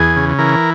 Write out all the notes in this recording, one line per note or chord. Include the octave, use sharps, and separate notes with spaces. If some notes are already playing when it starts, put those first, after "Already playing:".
Already playing: E2 G#4
C#3
E3 A#4